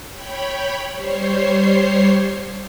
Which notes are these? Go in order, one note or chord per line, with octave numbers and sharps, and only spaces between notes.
C#5 G5 B5
G3 C5 C#5 C7